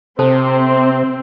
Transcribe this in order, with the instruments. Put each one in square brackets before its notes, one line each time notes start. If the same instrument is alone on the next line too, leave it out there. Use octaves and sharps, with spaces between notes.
[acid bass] C3 [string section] C4 [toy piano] A4 C5 A5